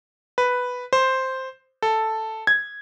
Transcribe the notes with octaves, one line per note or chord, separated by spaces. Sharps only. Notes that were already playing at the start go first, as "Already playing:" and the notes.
B4
C5
A4
G#6